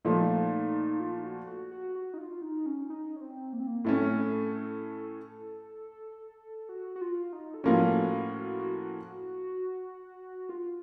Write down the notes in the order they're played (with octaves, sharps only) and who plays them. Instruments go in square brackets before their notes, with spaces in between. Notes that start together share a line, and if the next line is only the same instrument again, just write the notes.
[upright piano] A#2 F3 A3 [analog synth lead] D#4
[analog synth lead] F4
F#4
F#4
F#4
F#4
D#4
F4
D#4
C#4
D#4
C#4
C4
A#3
C4
A#3
[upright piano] A2 A3 C#4 [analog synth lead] C4
[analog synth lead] A4
A4
F#4
F#4
F4
D#4
A4
[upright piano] A2 F3 A#3 C#4 [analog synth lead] F#4
[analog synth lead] F#4
F4